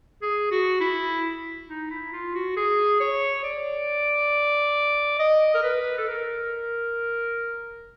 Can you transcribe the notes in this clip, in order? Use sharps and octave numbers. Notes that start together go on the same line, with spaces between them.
G#4
F#4
E4
D#4
E4
F4
F#4
G#4
C#5
D5
D#5
A#4
B4
A4
A#4